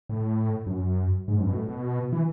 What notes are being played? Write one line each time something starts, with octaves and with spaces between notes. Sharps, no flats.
A2
F#2
G#2
F#2
B2
A2
B2
E3